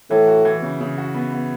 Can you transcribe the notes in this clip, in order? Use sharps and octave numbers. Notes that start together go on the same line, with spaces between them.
A2 E3
F#4
E3
C#3
C#3
F#4
B3
B3